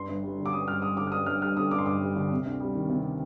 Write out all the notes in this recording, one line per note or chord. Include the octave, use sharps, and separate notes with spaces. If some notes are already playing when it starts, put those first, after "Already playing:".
Already playing: G2 C6
G1
G3
D3
D6
G2 D#6
G1 F6
G3 D#6
D3 D6
F6
G2 D#6
G1 F6
G3 F6
D3 D#6
G2 D6
C6
G1 D6
G3
D3
C3
D2
G3
D#3
C3